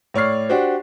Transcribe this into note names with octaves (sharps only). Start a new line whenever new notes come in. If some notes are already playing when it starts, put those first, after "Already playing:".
A2 C#5 D5 F6 C7
D4 F#4 G4 C5